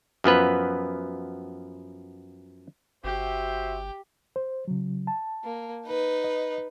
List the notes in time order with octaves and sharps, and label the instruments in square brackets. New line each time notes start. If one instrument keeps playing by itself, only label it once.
[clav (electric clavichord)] F#2 F3 B3 B4
[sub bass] G1 [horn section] F#4 C5 E5 [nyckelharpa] G4
[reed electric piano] C5
C#3 F#3
A5
[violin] A#3
D#4 B4
[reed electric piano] D#5